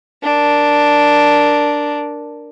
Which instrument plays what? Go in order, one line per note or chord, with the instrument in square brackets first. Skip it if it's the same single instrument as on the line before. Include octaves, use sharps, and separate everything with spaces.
[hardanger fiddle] D4 A#4